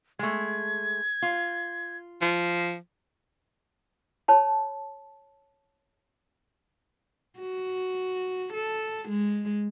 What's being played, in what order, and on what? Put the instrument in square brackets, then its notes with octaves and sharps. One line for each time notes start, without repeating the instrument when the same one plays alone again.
[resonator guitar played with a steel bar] G#3 A3 [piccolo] G#6
[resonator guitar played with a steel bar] F4
[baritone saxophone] F3
[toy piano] C#5 A5 B5
[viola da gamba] F#4
A4
G#3